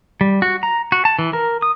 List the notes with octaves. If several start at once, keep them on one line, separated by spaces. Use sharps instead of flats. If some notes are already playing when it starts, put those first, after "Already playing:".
G3
F#4
A#5
F#4
A5
E3
A#4
D#6